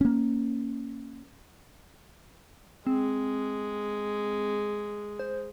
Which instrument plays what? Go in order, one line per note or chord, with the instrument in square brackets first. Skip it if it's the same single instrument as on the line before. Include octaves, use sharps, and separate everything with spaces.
[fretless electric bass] A#3 C#4
[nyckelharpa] G#3 [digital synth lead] C4
[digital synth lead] C5